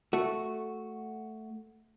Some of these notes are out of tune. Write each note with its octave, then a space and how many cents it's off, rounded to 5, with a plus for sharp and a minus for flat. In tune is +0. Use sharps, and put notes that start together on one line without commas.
A3 +0 F#4 +0